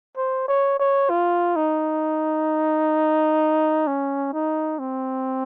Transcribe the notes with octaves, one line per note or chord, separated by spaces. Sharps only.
C5
C#5
C#5
F4
D#4
C#4
D#4
C4